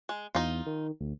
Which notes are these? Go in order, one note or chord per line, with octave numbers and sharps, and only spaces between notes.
G#3
E2 D#4 F4
D#3
D2